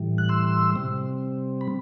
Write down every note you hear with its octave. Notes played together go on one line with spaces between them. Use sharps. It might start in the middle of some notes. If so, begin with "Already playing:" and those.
Already playing: A2 E3 G3
F#6
C6 E6
C3 G3 C4
B5